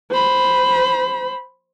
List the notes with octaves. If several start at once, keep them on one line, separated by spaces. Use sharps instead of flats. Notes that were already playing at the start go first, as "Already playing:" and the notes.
C5 B5